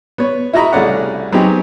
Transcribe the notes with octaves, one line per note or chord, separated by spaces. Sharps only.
B3 C#5
E4 F#4 D#5 A#5 B5
C2 C#3 A3 C#4 D5 F#5
F#3 B3 C4 D#4 G4 G#4